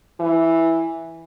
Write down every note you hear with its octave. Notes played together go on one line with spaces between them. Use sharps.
E3